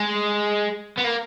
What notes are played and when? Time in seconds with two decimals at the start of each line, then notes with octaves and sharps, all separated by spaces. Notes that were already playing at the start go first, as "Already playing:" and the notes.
Already playing: G#3
0.98 B3
1.04 A#3